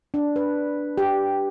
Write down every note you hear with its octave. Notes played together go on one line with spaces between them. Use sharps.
D4
B4
G4